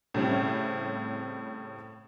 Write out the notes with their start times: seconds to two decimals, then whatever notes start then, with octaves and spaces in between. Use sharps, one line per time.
0.14 A2 C#3 G3 C4 C#4